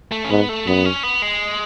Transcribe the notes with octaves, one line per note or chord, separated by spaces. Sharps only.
A3
C#4
G#2 B3
A3
F#2 B3
C#4
B3
G#3